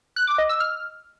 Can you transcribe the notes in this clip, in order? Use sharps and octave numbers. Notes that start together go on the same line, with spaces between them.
F#6
D6
D#5
E6
F6